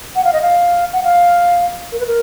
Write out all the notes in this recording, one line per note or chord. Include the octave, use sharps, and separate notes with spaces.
F#5
F5
D#5
F5
F#5
F5
A#4
B4
A#4